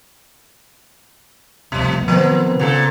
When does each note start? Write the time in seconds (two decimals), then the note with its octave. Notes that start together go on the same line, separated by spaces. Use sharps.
1.72 F1 C2 B2
2.08 D#3 F3 B3 C4
2.59 A#2 C#3 F#4 A4